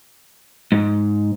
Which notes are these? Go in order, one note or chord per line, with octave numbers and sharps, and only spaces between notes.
G#2